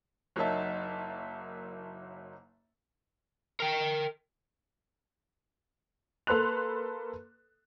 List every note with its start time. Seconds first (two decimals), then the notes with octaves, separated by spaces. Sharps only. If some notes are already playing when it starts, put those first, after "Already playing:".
0.36 F#1 F#3 A#3 D#4 E5 A5
3.60 A#4 G5
6.27 A#3 A4 B4 C6 F#6 F7